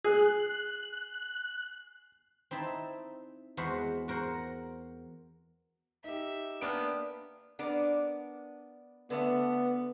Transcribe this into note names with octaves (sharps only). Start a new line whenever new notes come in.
G#4 F#6
C4 D#4 E4 E5 A5
E2 G#3 F#4 C5 F#5 B5
F#4 A#4 C5 F#5
D#4 G4 E5
A#3 B3 D4 G4 F6 D7
B3 D4 A#4
D3 A3 B3 E5